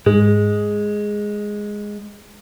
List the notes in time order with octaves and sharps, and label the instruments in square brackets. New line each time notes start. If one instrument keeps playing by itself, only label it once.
[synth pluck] G#2 [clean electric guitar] G#3